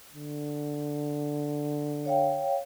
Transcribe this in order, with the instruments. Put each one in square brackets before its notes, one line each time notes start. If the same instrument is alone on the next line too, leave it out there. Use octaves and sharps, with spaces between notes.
[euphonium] D3
[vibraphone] C#5 F5 G5